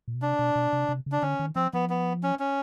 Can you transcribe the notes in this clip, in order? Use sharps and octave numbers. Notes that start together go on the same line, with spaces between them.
A#2
B2
C3 D4
B2
B2
C3
C3
C#3
D4
D3 C#4
D#3
F3 C4
F3 B3
B3
C#4
C#4